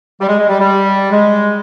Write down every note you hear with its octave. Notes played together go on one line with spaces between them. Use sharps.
G3
G#3
G#3
G3
G3
G#3